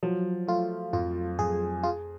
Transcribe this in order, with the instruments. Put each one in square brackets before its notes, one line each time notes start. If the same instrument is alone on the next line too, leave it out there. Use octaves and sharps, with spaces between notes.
[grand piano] F3 [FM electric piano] F#3
[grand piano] A3 [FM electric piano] F4
[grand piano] F2 [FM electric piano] F4
[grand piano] F2 [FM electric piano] G#4
[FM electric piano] F4 [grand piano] G#4